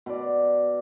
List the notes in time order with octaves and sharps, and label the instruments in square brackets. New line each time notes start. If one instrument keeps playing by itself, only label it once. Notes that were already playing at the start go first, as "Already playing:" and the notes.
[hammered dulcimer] B2 D5